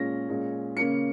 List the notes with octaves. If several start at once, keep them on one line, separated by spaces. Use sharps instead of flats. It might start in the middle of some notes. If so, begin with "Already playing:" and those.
Already playing: A#2 G#3 C#4 A#6
A#2 G#3 C#4
C#3 A#3 C#4 C#7